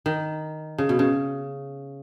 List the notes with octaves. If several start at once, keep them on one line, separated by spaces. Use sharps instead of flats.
D#3
C#3
B2
C#3